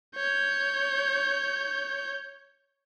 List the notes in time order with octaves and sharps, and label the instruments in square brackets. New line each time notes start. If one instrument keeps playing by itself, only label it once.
[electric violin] C#5 G6